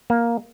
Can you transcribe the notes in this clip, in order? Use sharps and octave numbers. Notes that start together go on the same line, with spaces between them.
A#3